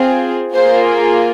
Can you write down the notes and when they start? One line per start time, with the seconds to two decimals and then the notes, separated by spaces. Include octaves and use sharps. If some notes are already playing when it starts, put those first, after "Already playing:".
Already playing: C4 F4 G#4
0.54 A#3 F4 G#4 C5